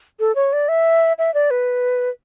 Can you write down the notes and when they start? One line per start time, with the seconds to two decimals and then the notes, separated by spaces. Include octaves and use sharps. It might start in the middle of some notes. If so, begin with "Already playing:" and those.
0.20 A4
0.35 C#5
0.53 D5
0.69 E5
1.18 E5
1.34 D5
1.51 B4